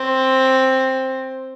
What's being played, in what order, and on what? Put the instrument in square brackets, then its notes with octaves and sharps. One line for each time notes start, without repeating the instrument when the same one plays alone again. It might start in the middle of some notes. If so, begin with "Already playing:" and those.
Already playing: [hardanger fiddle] C4